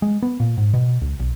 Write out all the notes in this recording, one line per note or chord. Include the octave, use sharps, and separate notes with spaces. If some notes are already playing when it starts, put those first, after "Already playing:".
G#3
B3
A#2
G#2
B2
C#2
B1